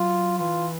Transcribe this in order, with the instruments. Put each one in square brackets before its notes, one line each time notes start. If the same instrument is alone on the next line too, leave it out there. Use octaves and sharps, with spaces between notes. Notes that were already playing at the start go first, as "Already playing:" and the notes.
Already playing: [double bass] F#3 [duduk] F4
[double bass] E3 [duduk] F4